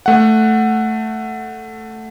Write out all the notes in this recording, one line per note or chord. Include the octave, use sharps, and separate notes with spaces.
A3 F#5